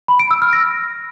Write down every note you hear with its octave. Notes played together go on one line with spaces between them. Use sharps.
B5
D7
E6
F6
A#6